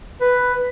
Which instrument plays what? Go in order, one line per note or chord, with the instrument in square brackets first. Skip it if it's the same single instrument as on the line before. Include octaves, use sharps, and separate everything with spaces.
[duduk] B4